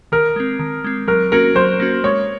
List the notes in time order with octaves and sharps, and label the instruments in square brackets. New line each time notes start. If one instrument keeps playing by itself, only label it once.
[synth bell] D#3 [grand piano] A#4
[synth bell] G#3 C4
D#3
G#3 C4
[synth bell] F#3 [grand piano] A#4
[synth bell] A#3 C#4 F#4 [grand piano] A#4
[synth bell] F#3 [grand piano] C5
[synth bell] A#3 C#4 F#4
[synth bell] G#3 [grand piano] C#5